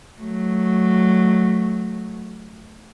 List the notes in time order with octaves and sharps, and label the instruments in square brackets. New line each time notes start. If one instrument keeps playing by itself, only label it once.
[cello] F#3 A3